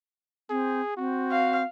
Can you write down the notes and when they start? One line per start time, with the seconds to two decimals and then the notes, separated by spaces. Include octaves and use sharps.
0.50 C4 G#4
0.97 C4 F#4
1.31 F5